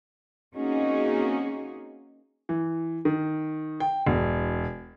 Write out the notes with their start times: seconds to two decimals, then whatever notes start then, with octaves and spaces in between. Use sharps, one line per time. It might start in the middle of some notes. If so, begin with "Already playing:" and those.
0.55 A#3 C4 C#4 D#4 F#4 G#4
2.49 E3
3.05 D#3
3.80 G5
4.07 E1